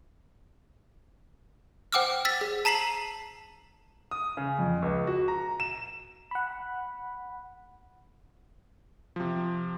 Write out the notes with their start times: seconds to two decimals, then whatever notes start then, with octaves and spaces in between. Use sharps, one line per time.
1.92 C5 F#5 G5 D6 E6 F6
2.25 E6 A6 B6
2.41 G#4
2.65 A5 A#5 B6 C7 F#7
4.11 D#6
4.37 C#3
4.59 F2
4.82 C#2
5.07 F#4
5.28 A#5
5.60 E7
6.31 F#5 B5
9.16 C3 F3